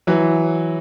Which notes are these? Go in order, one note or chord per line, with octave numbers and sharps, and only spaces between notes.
E3 F#3